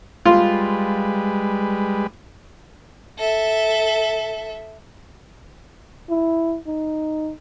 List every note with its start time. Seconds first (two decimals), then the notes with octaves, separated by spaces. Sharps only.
0.26 G3 G#3 F4 B4
3.18 A4 E5
6.09 E4
6.67 D#4